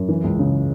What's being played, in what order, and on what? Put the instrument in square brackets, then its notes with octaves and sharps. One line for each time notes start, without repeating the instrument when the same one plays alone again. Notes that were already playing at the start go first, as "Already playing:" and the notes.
Already playing: [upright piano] F#2
E3
C#2
C#3